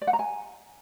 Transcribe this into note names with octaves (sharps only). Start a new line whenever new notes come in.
D5
F#5
A#5
G#5